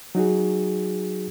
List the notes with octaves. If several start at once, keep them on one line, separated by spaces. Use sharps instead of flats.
F#3 D#4 F#4 G#4